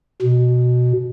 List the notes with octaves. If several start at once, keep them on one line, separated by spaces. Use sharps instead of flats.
B2